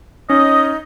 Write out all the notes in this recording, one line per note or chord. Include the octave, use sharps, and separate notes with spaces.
C#4 D#4 D#5